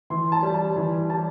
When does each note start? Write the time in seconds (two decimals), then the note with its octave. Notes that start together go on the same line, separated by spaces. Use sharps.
0.10 E3 C6
0.32 A5
0.43 G3
0.54 A5
0.76 E3
1.10 G3 A5